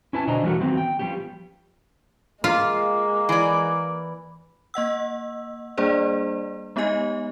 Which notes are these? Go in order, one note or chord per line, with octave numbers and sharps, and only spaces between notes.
C#4 E4 B4 G#5 A5
B2 D3 D4 C5 D#5 A#5
E3 G3 A3 F#4 A#4
D#3 F#3 B3 C4
G5
F3 G3 B3 C#4 G4
G#3 A#3 F4
E3 D5
A#3 D#5 F#5 E6
G3 A#3 D4 G#4 C5 D5
G#3 B3 D#4 G4 D#5 G#5